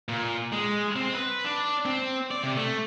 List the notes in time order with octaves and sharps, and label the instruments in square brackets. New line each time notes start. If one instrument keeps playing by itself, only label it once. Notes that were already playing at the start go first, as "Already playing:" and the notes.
[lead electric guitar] A#2
G#3
C4
B4
D4
C4
D5
C3
A3